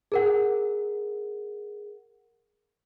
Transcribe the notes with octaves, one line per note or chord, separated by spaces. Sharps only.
G#4 A#4 F#5